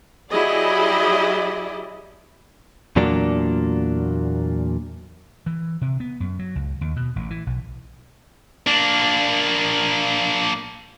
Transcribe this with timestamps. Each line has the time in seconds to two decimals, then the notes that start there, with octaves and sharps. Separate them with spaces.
0.30 F#3 E4 G4 G#4 D5 D#5
2.96 E2 A#2 F#3 A#3 D4
5.46 E3
5.81 C3
6.00 B3
6.20 F#2
6.39 F#3
6.55 C#2
6.81 D#2
6.96 B2
7.16 A1
7.30 E3
7.46 B1
8.67 A#3 D4